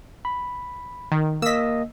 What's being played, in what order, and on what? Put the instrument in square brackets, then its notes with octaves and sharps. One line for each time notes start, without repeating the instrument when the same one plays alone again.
[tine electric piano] B5
[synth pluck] D#3
[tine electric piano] A#3 D#5 [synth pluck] E6 B6